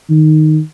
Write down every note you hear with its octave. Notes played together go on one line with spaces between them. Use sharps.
D#3